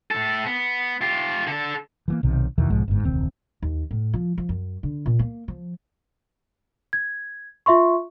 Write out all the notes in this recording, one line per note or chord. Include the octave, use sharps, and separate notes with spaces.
A2 A4
B3
F4 G4
D3 A4
E3 F#3 A#3
B1 C3 D#3
E2 B2 D#3 E3
B1 G#2 F3 G#3
G1 G#2
E1 C#2 D#3 C4
D#2
A2
F3
F3
F#2
D3
A#2
A#3
F3
G#6
F4 E5 C6 C#6